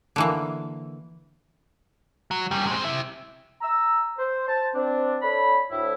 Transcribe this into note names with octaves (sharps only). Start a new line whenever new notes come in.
D3 E3 A#3
F#3
F#2 G3
G#3 C4
C3 E4
A#5 E6
C5
C5 A5
C4 D4
D4 A4 C#5 B5
D2 A2 E4